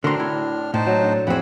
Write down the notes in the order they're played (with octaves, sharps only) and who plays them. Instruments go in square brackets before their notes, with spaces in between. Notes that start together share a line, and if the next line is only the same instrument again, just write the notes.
[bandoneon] A2 D4 F6 [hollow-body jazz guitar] D3 C6 [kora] C4 F#4 A#4
[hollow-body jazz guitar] E4
[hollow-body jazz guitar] A2 [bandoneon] D#4 C5 A5
[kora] F#3 F#4
D4 A4
[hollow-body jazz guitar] F2 C4 [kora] E3 G#4 [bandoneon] F#5 B5